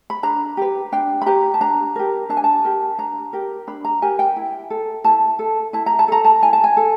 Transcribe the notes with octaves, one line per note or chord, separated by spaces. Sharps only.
B5
D4 A#5
G4 B4
D4 G5
B5
G4 B4 A#5
A5
D4 A#5
G4 A#4
D4 A5
G#5
A5
G4 A#4
D4 A#5
G4 A#4
D4 B5
A#5
G4 A#4 G#5
G5
E4
A4
E4 A5
A4
E4 A5
A#5
A5
A4 A#5
A5
E4 G#5
A5
G#5
A4